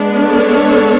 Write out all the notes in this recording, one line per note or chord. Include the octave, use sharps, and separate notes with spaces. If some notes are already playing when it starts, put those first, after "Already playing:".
Already playing: G#3 B3 D4
A4 C#5